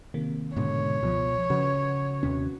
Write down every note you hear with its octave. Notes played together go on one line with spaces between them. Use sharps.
C3 D#3 A#3
G#2 B2 D3 C#5
C#2 B2 F3
C#3 F3 F#4 B4
D#2 C3 C#4